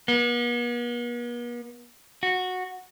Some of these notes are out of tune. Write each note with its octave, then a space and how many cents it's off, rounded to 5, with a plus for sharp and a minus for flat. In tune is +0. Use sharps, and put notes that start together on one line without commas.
B3 -45
F#4 -10